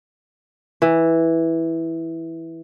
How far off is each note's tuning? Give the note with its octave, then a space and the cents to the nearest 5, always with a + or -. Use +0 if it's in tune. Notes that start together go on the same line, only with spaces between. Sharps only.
E3 -5